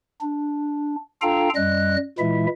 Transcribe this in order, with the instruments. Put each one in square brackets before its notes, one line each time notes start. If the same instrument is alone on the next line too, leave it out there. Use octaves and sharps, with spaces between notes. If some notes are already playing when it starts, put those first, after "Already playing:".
[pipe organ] D4
D4 F4 A4 F5 G5 A#5
F#2 G3 D#5 F#6
A#2 E3 G#3 E4 E5